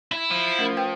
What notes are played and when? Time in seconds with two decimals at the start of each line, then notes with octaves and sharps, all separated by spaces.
0.12 E4
0.31 F3
0.58 A3 C#4 A#4
0.77 B4 G5